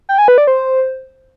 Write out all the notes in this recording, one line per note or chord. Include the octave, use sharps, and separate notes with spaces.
G5
G#5
B4
D5
C5